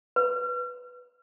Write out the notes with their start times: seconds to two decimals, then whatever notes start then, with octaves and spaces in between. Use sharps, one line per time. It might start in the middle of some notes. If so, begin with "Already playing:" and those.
0.16 B4